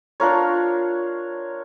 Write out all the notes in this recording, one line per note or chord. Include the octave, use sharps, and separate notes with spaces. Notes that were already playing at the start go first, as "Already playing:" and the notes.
D4 F4 A#4 C#5